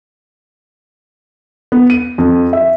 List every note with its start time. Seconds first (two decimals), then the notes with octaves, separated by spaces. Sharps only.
1.72 B3
1.90 D#7
2.18 F2
2.53 E5